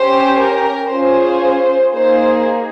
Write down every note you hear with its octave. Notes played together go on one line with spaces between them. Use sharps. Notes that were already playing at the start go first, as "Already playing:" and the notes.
Already playing: C#4 G4 C5
A#4
C#4 F4 G#4 C5
A#3 D#4 G#4 C5